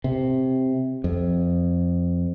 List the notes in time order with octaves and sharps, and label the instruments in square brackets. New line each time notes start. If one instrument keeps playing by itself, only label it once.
[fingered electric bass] C3
F2